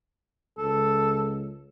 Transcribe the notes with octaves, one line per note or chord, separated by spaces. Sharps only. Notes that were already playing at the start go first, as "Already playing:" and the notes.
C#2 A4